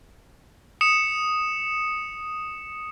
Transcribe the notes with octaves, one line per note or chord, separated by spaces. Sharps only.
D#6 C#7 E7